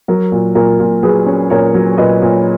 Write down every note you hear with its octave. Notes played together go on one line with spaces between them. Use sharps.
F#3 A#4
A#2
A#2 A#4
A#2
F#3 G#4 B4
C#4
A#2 A#4 C#5
F#3
A#2 B4 D#5
A#2